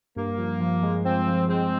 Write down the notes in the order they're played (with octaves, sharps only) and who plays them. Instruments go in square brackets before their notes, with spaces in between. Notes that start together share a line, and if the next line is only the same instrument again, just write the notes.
[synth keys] G2 [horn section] A#3
[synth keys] F3
F3
G#3
[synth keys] F3 [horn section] C4
[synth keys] F3
[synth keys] G#3 [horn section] C4